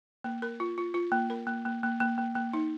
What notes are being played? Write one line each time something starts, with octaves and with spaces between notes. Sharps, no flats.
A#3
A#4
F4
F4
F4
A#3
A#4
A#3
A#3
A#3
A#3
A#3
A#3
D#4